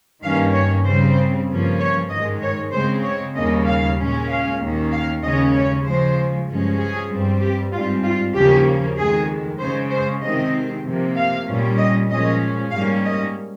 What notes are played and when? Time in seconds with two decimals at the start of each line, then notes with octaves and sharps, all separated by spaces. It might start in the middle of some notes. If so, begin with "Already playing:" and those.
0.23 G2 D#3 A#3 C#4 F5
0.54 C#5
0.85 C#3 G3 C4 C5
1.48 G2 F3 A#3 C#4
1.79 C#5
2.10 G#2 D#3 G#3 D#5
2.42 C#5
2.72 C#3 G#3 C4 C5
3.04 C#5
3.35 D#2 C#3 G3 A#3 C#4 D#5
3.66 F5
3.97 A#2 G#3 C#4
4.29 F5
4.60 D#2 D#3 A#3 C#4
4.91 F5
5.22 D#2 C#3 G#3 C#4 D#5
5.54 C#5
5.85 C#3 F3 G#3 C5
6.47 G2 F3 G#3 C#4
6.79 G#4
7.10 G2 G3 C4
7.41 G4
7.72 G#2 G3 C4 F4
8.03 F4
8.34 D#2 C#3 F3 A#3 C#4 G4
8.97 F2 D#3 G#3 G#4
9.59 C#3 G#3 C#4 C5
9.90 C5
10.22 C3 D#3 G#3 C4 D#5
10.84 C3 F3 A#3
11.16 F5
11.47 A#2 G3 C#4
11.78 D#5
12.09 A#2 F3 G#3 C#4 D#5
12.71 G#2 G3 A#3 C#4 F5
13.03 D#5